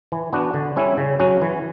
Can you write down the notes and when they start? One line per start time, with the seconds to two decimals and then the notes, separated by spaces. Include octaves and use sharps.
0.12 E3
0.33 B3 D4 F#4
0.54 D3
0.76 G3 C#4 E4
0.97 C#3
1.20 F#3 C#4 F#4
1.42 E3